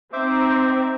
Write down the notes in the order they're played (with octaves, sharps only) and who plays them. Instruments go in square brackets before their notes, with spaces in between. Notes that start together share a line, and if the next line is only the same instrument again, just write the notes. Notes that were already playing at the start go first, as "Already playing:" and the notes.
[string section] C4 D#4 [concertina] C5 E5 D6